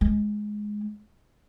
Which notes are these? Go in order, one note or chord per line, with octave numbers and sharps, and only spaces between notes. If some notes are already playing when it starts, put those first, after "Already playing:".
G#3